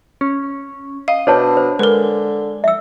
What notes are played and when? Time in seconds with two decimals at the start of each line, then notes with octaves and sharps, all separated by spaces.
0.21 C#4
1.08 D#5 F5
1.27 B2 D4 C5 C#5 A5
1.57 C5
1.79 D3 G#3 A#4 B4
2.64 E5 E6